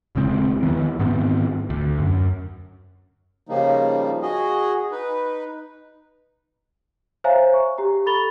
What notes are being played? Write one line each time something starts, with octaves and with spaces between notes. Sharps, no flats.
D#1 C#3 G#3 C4
D#3 E3 G#3 B3
G#2 D#3 B3 C4
D2
F#2
C#3 F3 G3 A#3 D#4
F#4 G#4 D#5
D#4 B4
C5 C#5 E5 F5 G#5 A#5
C#6
G4 A#5
A4 B5 C#6 A6 F7 G7